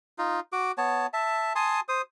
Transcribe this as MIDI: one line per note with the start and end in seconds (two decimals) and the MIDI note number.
0.18 0.40 63
0.18 0.40 65
0.52 0.72 66
0.52 0.72 86
0.78 1.07 59
0.78 1.07 73
0.78 1.07 81
1.13 1.53 76
1.13 1.53 81
1.55 1.80 80
1.55 1.80 81
1.55 1.80 84
1.55 1.80 87
1.89 2.02 72
1.89 2.02 87